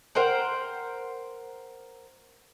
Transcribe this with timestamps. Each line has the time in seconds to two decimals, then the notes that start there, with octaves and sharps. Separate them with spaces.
0.15 A#4 C5 F#5 G5